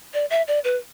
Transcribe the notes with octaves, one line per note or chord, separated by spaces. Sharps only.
D5
E5
D5
B4